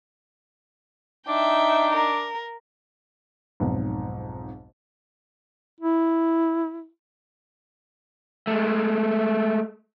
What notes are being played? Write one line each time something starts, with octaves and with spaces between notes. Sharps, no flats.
D4 D#4 E5 G5
A#4
B1 F2 G#2
E4
G#3 A3